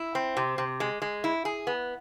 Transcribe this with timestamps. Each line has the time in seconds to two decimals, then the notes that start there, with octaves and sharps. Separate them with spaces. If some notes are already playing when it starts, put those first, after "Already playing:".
Already playing: E4
0.15 C4
0.37 C3
0.58 C3
0.80 G#3
1.02 G#3
1.24 E4
1.45 G#4
1.67 B3